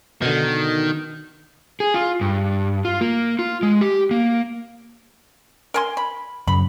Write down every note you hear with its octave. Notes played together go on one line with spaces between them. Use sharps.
B2 D3 D#3
G#4
F4
G2
F4
A#3
F4
G#3
G4
A#3
A#4 G#5 C6
B5
F#2 C#3 B5